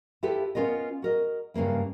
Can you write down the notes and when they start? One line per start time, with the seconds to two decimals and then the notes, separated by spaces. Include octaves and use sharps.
0.23 E4 F4 G4 A4 B4
0.55 B3 C#4 F4 A#4 D#5
1.02 F#4 A#4 D#5
1.54 G2 C#3 E3 A#3 E4